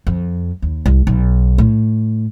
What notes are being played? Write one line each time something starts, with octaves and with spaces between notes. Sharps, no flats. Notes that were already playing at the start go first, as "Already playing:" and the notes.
F2
D#2
C2
B1
A2